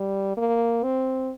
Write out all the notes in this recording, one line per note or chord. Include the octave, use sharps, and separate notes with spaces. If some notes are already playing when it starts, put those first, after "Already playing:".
Already playing: G3
A#3
C4